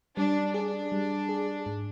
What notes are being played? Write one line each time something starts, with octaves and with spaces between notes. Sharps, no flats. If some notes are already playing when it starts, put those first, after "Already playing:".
G3 D4
D4 G#4
G3
G#4
G#2